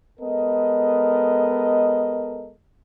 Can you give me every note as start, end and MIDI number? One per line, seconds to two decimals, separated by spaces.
0.20 2.52 56
0.20 2.52 59
0.20 2.52 69
0.20 2.52 70
0.20 2.52 75